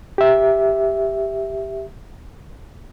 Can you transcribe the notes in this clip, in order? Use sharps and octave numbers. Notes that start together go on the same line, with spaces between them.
G4 E5